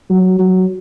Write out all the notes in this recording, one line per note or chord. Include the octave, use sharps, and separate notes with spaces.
F#3
F#3